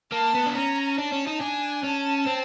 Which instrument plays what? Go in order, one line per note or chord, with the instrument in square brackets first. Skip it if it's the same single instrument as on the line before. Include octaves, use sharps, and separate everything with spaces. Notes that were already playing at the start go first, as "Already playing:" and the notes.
[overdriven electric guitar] A#3 [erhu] A5
[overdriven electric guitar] B3
D4
[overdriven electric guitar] C#4 [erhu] A#5
[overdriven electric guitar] D4 [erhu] A5
[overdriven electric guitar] C#4
D#4
[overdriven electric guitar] D4 [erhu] G#5
[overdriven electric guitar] C#4 [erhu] A5
[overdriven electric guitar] C4